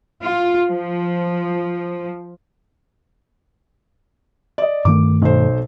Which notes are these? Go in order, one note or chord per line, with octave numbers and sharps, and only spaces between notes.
F4
F3
D5 D#5
G2 D#3 A3 D6
B1 A4 C5